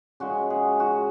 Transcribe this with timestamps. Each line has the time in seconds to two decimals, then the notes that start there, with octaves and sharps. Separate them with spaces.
0.20 C#3 G#3 F#4
0.50 G#4
0.80 F#4